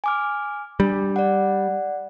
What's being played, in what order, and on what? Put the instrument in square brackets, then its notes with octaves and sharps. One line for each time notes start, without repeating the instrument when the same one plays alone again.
[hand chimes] G#5 D6 F6
[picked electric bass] G3 [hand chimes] D4
[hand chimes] D5 F#5